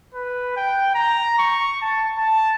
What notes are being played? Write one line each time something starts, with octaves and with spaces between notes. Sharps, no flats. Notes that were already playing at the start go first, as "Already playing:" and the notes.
B4
G5
A#5
C#6
A5
A5